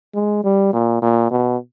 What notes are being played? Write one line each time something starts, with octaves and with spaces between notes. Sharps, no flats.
G#3
G3
A#2
A#2
B2